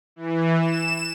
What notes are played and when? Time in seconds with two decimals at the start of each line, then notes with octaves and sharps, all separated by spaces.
0.16 E3
0.60 E7